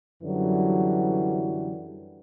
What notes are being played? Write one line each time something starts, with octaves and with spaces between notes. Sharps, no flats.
F#2 D3 E3 F#3 G3